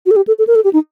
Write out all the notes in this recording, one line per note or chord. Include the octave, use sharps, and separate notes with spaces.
F#4
A4
G4
A4
A4
A#4
A4
G4
D#4